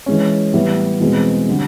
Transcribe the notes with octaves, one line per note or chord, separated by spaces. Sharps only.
E3 G#3 C#4
A2 E3 G3 B3
E2 B2 G#3 C4
D3 G3